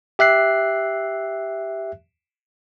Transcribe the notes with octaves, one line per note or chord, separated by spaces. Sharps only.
G4 E5 F#6 C7